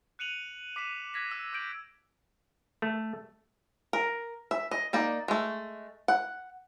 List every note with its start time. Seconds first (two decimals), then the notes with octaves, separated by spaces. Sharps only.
0.19 F#6 C#7 D#7 F7 F#7
0.76 D6 B6 C7 D#7 E7
1.14 E6 F#6 G#6 A#6 B6
1.31 E6
1.52 C#6 G6 D7 F#7
2.82 A3
3.93 A#4
4.51 E5
4.71 D#5
4.93 A#3 D#4 D5
5.28 G#3 A3
6.08 F#5